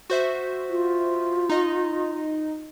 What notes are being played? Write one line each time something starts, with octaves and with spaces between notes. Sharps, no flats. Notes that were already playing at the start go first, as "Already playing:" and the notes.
F#4 C5 E5
F4
D#4 D#5